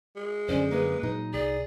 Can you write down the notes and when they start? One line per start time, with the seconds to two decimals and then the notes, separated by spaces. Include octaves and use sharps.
0.16 G#3
0.49 F#2 D3 C#4 C5 D5
0.71 A#3 G#4 B4
1.03 A#2 F#3 D#4
1.33 C2 G#4 D5